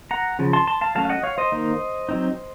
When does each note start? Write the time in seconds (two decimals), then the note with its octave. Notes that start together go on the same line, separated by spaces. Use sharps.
0.11 F#5 A#5
0.39 C#3 F3
0.53 A5 C6
0.67 A5 C6
0.81 F5 A5
0.95 F#3 A3 C#4 F5 A5
1.05 F5
1.10 D#5 F#5
1.23 C#5 F5
1.38 C5 D#5
1.52 D#3 A#3 D#4
2.09 F#3 C4 D#4